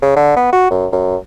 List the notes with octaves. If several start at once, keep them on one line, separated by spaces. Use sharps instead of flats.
C#3
D3
B3
F#4
F#2
F#2